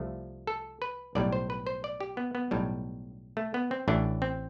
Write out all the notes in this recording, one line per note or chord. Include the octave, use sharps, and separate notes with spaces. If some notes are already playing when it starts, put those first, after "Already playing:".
Already playing: C2 C3 F3 A3
A4
B4
B1 A2 G3 D5
C5
B4
C5
D5
G4
B3
B3
B1 A2 G3
A3
B3
C4
A1 A2 E3 D4
C4